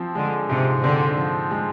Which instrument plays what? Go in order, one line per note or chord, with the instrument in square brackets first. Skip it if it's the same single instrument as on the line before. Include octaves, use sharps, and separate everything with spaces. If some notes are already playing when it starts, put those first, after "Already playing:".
Already playing: [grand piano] F3 C4
[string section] D3 [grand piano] G#3
[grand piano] G#2 [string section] C3
[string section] D3 [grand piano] C4
[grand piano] F3
G#3